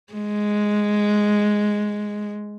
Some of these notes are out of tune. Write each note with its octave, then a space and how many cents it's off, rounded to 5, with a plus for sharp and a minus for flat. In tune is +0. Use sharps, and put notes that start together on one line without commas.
G#3 +0